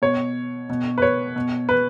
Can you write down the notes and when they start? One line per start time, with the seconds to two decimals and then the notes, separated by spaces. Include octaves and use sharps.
0.02 B2 C#5
0.69 B2
0.98 B4
1.02 C#5
1.36 B2
1.69 B4